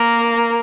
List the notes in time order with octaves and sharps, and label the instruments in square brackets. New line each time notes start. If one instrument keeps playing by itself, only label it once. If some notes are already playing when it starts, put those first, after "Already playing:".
Already playing: [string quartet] A#3 A#4